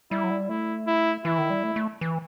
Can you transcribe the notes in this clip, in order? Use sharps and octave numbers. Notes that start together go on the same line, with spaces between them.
G3 E4
F#3
G3
A3 E4
E4
E3 E4
D#3
G3
A3
A3
E3